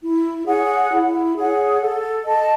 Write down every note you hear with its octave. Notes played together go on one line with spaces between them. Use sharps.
E4
G#4 C#5 F#5
E4
G#4 C#5 F#5
A4
D#5 A5